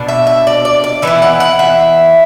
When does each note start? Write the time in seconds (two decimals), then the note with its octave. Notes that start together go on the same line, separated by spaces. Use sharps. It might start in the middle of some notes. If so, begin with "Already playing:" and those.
Already playing: B2 D4
0.08 E5
0.27 E5
0.47 D5
0.65 D5
0.84 D5
1.02 E3 B3 E4 E5
1.22 F#5
1.40 F#5
1.59 E5